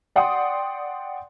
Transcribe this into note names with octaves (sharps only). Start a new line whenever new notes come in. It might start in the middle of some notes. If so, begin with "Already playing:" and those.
D5 F#5 G5 C6 D#6